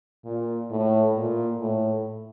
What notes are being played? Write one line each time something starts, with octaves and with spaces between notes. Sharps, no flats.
A#2
A2
A#2
A2